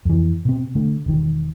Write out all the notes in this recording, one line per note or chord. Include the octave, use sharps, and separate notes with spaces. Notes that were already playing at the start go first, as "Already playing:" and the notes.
F2 E3
B2 C4
D3 A3
E1 D#3